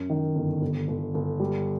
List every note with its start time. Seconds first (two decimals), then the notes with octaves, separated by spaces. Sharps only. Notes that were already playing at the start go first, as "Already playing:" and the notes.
Already playing: F#2
0.10 D#3
0.35 G1
0.62 G1
0.88 G1
1.14 G1
1.40 G3